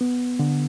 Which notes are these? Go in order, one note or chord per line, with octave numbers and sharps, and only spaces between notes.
B3
D3